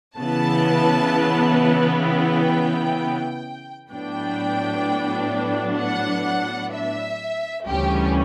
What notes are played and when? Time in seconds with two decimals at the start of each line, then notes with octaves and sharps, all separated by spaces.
0.17 C#3 E3 B3 E4 A5
2.04 G5
3.91 A2 F#3 B3 D4 G5
5.79 F#5
6.72 E5
7.65 D2 C#3 E3 G3 C#4 G4